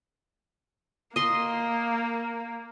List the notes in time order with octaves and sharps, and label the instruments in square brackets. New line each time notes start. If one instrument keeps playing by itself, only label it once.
[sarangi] A#3 [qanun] D#5 C6